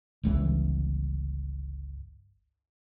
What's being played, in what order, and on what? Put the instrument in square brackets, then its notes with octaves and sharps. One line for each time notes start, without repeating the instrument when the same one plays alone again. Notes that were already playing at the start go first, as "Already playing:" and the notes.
[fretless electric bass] G1 C#2 E3